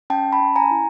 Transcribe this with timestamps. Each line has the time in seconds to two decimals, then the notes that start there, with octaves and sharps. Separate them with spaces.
0.10 C#4 G5 A5
0.32 A5 B5
0.40 C#4
0.56 G#5 A#5
0.71 E4